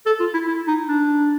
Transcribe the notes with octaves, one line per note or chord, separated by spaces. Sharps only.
A4
F4
E4
E4
D#4
D4